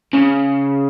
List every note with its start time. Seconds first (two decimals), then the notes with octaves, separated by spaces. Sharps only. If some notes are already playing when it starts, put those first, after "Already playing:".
0.14 C#3